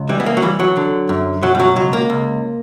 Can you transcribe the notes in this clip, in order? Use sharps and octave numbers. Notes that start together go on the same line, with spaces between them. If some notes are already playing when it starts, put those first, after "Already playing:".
Already playing: C#2
E3 G3
B3
A#3
F#3
E3 G3
F#3
D3
F#2
B2 F#3
G3
F#3
C#2 F#3
A#3
C#2